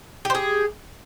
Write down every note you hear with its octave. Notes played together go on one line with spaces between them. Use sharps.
G4 G#4 C5